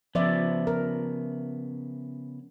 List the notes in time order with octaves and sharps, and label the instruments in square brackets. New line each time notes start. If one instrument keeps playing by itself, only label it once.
[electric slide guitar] C#3 B3 [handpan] F3 D5 E5
[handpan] A#4